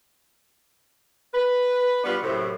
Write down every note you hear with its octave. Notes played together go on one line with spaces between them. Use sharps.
B4
G3 B3 D4 F4 F#4 B4
F#2 A2 C3